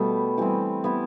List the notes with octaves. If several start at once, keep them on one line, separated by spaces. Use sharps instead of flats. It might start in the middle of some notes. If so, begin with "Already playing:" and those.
Already playing: B2 G3 A3 B3
E3 G3 C4
G3 B3 E4